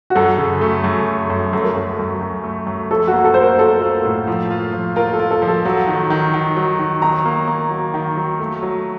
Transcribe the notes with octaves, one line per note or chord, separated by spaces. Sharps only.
F#4
F#2 A4
C#3
A3
F#2
A3
F#2
F#2 A4
A#4
F#2 A4
F#2
F#2
A3
F#2
F3 A4
F#4
A#3
A4
F4 C5
A#4
F4 A4
F4
A2
F3
F4
F3
F4 A#4
A4
F4
A4
F3
A4
F#3 F#5
D#3
D#3
D#3
F#3
D#3
D#3 A#5
A#3
A#3
F#3
D#3
F#3
A3
F#3